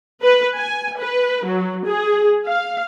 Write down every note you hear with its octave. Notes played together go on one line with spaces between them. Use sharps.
B4
G#5
B4
F#3
G#4
F5